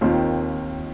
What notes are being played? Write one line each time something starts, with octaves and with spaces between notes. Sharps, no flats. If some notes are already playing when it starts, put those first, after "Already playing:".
D#2 D#3 C4 F4